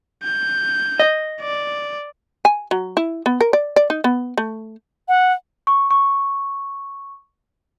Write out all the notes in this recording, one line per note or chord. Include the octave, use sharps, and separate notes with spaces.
G6
D#5
D5
G#5
F#3
E4
B3
A#4
D5
D5
D#4
B3
A3
F#5
C#6
C#6